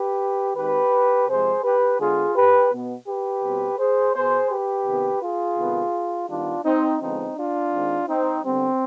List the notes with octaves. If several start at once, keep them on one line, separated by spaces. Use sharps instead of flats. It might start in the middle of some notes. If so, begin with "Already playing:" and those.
Already playing: G4 B4
D#3 G#3 C4 G4 B4
C3 F3 G#3 G#4 C5
G4 B4
D3 G#3 B3 F4 G#4
G4 B4
B2 B3
G4 B4
B2 G3 C4
G#4 C5
B2 B3 G#4 C5
G4 B4
C3 D#3 B3
F4 G#4
C3 D#3 G#3 B3
D#3 G3 B3 D4 F4
C4 D#4
D3 F3 G#3 B3 C4 D#4
D4 F4
D#3 G#3 C4
C4 D#4
D3 G3 B3 C4